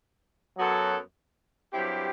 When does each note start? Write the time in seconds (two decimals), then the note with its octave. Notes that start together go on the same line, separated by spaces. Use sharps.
0.57 F#2 F#3 B3 F#4 A4
1.72 G2 F#3 C4 E4 G4